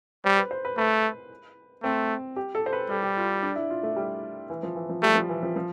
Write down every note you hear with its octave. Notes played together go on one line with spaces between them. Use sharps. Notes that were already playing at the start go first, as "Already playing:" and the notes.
G3 C5
B4
C5
B4
A3 B4
A3 C4
G4
A4
C5
B4
G3 A4
G4
F4
D4
E4
F4
A3
G3
E3
F3
E3
F3
G3 A3
F3
E3
F3
F3